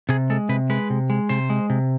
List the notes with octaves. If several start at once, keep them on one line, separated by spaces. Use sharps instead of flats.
C3 G#4
G#3 A4
C3 B4
G#3 B4
C3
G#3
C3 C5
G#3
C3